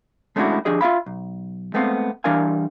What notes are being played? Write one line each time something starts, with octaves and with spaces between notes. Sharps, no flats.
G#3 A3 C#4 D4 E4 F#4
F3 D4 G4 G#4 D#5
F4 E5 F5 B5
B1
G#3 A3 B3 C4 F5
E3 G3 D4 A#4 F5 G#5